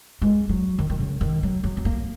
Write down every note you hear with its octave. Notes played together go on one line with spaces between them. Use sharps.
G#3
F#3
D#3
D#3
C#3
D#3
F#3
F#3
B3
A#3